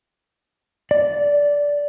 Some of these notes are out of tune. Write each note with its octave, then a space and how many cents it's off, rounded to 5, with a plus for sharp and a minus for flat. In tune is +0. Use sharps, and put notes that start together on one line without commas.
D5 -15